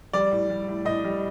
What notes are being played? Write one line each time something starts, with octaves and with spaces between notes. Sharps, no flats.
G3 D5
A2
G3
A2
A2 D#5
G3